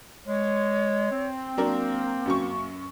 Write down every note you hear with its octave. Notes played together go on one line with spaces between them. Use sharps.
G#3 C#5
C4
F#3 A#3 D4 A#4
F#2 F#3 C#6